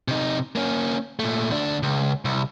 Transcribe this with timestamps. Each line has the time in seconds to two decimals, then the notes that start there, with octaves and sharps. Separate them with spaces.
0.08 C3 D#4
0.56 A#3 C#4
1.19 A#2 A3
1.50 D2 D4
1.83 C#2
2.25 C2